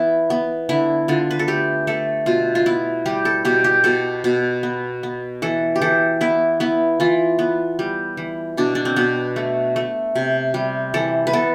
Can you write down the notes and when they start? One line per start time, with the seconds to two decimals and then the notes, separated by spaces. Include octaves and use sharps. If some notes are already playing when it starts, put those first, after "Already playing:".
Already playing: E3 B3 E4
0.30 B3
0.69 D3 E4
1.08 D3 F4
1.31 B4
1.39 A4
1.48 A3 G4
1.87 A3 A4
2.26 B2 F4
2.55 F4
2.66 B3 E4
3.06 G3 G4
3.25 A4
3.45 B2 G4
3.64 G4
3.84 B2 A4
4.24 B2
4.63 B3
5.03 B3
5.42 E3 A4
5.76 G4
5.82 E3 A4
6.21 B3 E4
6.60 B3 E4
7.00 E3 F4
7.39 B3
7.79 G3
8.17 E3
8.57 B2 D4
8.75 D4
8.85 C4
8.96 B2 B3
9.36 A3
9.76 A3
10.15 C3
10.54 G3
10.94 E3 A4
11.27 B4
11.33 B3 A4